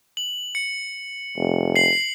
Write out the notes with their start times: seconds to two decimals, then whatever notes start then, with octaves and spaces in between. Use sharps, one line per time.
0.17 F#7
0.55 C#7
1.37 F1
1.76 C7 F#7